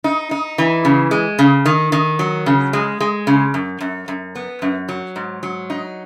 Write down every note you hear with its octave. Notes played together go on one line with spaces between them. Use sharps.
D#4
D#4
E3
C#3
G#3
C#3
D#3
D#3
F#3
C#3
G#3
G#3
C#3
F#2
F#2
F#2
B3
F#2
F#3
G#2
F#3
D#4